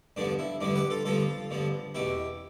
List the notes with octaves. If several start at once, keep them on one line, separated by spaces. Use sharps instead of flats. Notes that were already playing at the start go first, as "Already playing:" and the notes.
G2 D3 F3 B3 D4
E4
G2 D3 F3 B3 D4
G4 B4
F4 A4
G2 D3 F3 B3 F4 A4
G2 D3 F3 B3
E2 B2 B3 E4 G4